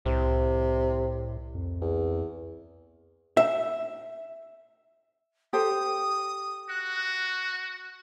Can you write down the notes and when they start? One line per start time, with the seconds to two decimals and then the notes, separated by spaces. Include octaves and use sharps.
0.06 C2 A2 C3
1.55 F2
1.81 E2
3.37 E5
5.53 G4 A4 C5 D#6
6.70 F#4 F#6